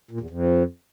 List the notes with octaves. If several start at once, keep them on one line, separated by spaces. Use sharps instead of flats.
A#2
E2
F2